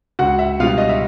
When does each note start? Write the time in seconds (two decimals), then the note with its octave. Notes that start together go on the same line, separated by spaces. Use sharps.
0.19 C#2 F#4 F#5
0.39 E5
0.60 B2 G3 F4 F5
0.78 D#5
0.89 E5